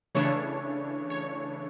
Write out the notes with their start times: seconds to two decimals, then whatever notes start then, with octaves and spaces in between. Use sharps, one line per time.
0.15 C#3 E3 A3 D4 C#5
1.10 C#5